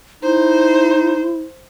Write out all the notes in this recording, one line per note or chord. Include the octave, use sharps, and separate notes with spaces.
D#4 E4 C5